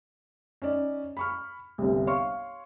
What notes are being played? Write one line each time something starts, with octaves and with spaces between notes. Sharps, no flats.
C#4 D#4 D5
B5 C#6 F6
G1 C2
C#5 F5 C6 C#6